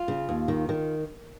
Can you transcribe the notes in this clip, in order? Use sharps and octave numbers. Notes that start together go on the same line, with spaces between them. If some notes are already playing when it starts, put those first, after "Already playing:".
Already playing: F4
C#3
D#2
D#3
D#3